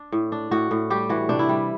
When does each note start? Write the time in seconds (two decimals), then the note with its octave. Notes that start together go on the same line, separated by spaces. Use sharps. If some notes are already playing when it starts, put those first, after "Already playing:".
Already playing: D4
0.12 A2
0.32 D4
0.51 A2 F#4
0.71 A2
0.90 G3 G4
1.09 E3 F#4
1.29 C3 D4
1.39 E4
1.49 G3